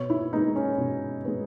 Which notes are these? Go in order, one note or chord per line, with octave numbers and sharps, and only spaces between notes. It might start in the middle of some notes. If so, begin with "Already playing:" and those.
Already playing: B2 C#5
E4
G#3 B3 D#4
C#4
B2
G#3 B3